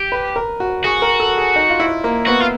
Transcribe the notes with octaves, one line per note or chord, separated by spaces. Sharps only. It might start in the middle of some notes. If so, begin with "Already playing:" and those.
Already playing: G4
B4
A#4
F#4
F#4 G#4
A#4
A4
G#4
D#4
F4
E4
A#3
B3 F#4
F4